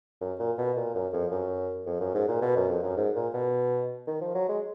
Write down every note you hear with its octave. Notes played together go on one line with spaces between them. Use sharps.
F#2
A#2
B2
A#2
F#2
F2
F#2
F2
F#2
G#2
A#2
B2
F#2
F2
F#2
G#2
A#2
B2
D#3
F3
F#3
G#3